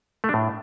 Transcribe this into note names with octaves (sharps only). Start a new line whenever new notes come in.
A3
D4
A2